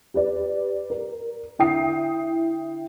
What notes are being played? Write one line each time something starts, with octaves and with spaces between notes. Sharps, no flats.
G4 B4 D5
A#4
D3 E4 G5 D#6 C7